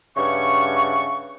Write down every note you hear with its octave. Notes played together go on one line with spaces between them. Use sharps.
G2 C#3 E5 F#5 C#6